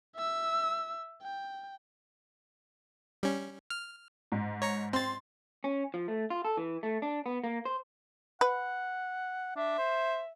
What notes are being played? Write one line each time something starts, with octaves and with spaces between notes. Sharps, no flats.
E5 E6
G5
G3 C#4
F6
G#2
C#5 A#5 C#6
C4 C6 A6
C#4
F3
A3
F4
A4
E3
A3
D4
B3
A#3
C5
B4 F#5
D4 E5
C5